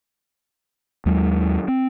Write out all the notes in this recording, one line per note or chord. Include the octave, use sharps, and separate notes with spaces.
D#2 F#3 G#3
C4